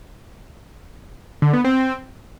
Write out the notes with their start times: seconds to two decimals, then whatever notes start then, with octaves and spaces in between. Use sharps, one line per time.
1.42 D3
1.53 B3
1.64 C4